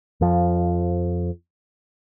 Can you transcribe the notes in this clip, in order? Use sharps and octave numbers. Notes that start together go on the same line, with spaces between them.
F2 F3